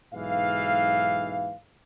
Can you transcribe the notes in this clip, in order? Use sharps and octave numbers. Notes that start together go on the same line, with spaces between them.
B1 G#2 E3 F5